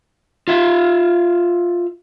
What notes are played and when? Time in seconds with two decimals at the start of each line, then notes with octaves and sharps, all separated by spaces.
0.48 F4 E5 F5